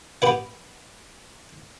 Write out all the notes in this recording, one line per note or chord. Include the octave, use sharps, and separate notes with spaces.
G4 B4 F#5